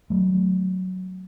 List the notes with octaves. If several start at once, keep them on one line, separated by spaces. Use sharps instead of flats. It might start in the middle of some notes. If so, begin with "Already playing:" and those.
F#3 A3